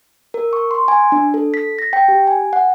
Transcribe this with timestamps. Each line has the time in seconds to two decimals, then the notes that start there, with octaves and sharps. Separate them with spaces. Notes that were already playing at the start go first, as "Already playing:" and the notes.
0.34 A#4
0.53 C#6
0.71 C6
0.88 G#5
1.12 D4
1.34 A4
1.54 B6
1.79 A#6
1.93 G5
2.08 G4
2.27 G#5
2.53 F#5